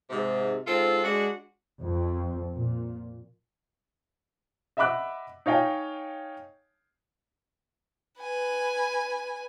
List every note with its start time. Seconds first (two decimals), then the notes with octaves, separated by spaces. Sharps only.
0.10 G#2 C3
0.67 G#2 C4 F4 A4
1.03 G#3 D4 F#4
1.82 F2
2.53 A#2
4.77 D#5 E5 F#5 B5 D6 F#6
5.46 D#4 C#5 F5 G5 G#5
8.19 B4 G#5